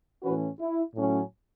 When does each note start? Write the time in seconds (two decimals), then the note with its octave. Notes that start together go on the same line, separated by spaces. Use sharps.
0.22 A2 E3 C#4 F#4 B4
0.59 E4
0.95 A2 F#3 C#4